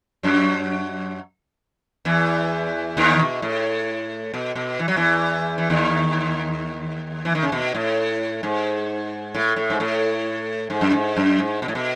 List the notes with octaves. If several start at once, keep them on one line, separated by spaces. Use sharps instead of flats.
F#2 F#3
E2 E3
D#2 D#3
B2
A2
B2
B2
E3
F#3
E2 E3
E3
D#2 D#3
E3
D#3
C#3
B2
A2
G#2
A2
A2
G#2
A2
G#2
F#2
G#2
F#2
G#2
B2
A2
B2